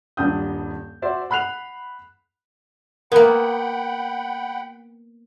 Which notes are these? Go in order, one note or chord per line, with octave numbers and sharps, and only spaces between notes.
D#1 G2 D4 G5 D#6 G6
F#4 C5 D5 E5
F#5 B5 F#6 C7 F7
A#3 B3 A#4 F#5 G5 B5